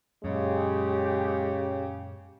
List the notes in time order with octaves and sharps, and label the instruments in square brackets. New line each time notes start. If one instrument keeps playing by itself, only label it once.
[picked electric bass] F#2 A#2 [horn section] C#3 [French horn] G#3 [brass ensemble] G4